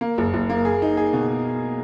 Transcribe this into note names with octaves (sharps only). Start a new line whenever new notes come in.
A#3
F#1
F#1
A#3
G#4
D#4
G#4
B2